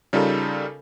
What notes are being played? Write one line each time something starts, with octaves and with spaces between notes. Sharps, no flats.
C#3 G3 D#4 F4 A4 A#4